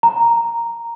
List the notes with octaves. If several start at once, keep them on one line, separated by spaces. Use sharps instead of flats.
A#5